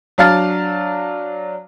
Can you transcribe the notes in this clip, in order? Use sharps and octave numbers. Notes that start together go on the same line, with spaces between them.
F#3 D4 F5 A5 F6 A6